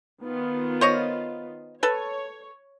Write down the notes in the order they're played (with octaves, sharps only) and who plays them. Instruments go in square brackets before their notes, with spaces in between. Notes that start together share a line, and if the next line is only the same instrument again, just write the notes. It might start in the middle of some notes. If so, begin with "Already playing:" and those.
[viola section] D#3 B3 F4
[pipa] C5 C#5 D#5
[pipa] A4 B4 [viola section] C#5